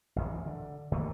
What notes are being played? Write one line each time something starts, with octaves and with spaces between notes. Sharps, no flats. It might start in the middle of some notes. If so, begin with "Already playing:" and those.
A1 F#2
E3
D3
F2 D#3 A3 A#3